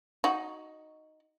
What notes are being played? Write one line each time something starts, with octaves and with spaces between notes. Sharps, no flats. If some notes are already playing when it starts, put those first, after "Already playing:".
D#4 F#4